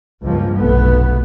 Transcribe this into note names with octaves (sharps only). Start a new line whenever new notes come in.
C#2 G2 F3 A#3
F1 B1 A3 B3